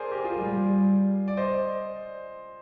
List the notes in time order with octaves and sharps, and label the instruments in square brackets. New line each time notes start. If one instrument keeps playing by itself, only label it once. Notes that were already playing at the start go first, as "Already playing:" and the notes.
Already playing: [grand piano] G#4 A#4 C5 D5
G4 A#4
F4 G#4
[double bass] G3
[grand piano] D5
C5 D#5